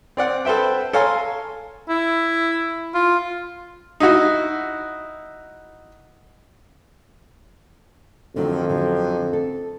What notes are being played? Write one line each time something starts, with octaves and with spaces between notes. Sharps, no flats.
C4 D5 F#5
A4 B4 C5 E5 G5
A4 C#5 F5 G#5 A#5 C6
E4
F4
D#4 E4 F#4
F2 D3 D#3 F#3
D3 F#3
A4